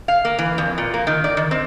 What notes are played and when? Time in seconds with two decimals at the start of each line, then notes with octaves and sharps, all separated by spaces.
0.08 F5
0.25 A#3
0.39 E3
0.58 F2
0.78 A#2
0.94 A#3
1.07 D#3
1.24 D5
1.37 D#3
1.51 C4